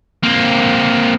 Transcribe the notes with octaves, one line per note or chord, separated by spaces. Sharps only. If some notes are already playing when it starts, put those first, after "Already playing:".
A#3 C4